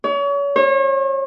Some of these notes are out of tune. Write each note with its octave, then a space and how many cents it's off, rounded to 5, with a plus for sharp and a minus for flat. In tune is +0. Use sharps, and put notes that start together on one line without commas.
C#5 +35
C#5 -40